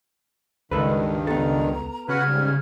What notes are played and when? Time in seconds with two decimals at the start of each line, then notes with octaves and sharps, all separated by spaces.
0.71 C#2 G2 D#3 G#3 A4 B4
1.27 B3 A4 A#5
2.09 C#3 F#4 B4 F#5 F6 G#6
2.28 G#2 G3